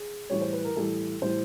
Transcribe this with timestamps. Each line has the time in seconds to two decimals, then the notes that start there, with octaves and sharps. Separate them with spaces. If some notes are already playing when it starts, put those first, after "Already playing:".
Already playing: G#4
0.30 A2 E3 G3 C#5
0.41 C5
0.53 B4
0.65 A#4
0.76 A2 E3 G3 A4
1.22 A2 E3 G3 C5